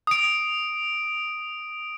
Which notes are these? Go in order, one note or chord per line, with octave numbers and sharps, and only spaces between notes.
D#6 D7